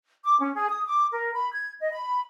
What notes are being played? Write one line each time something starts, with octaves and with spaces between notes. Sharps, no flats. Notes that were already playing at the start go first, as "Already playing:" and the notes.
D6
C#4
G#4
D#6
D6
A#4
B5
G#6
D#5
B5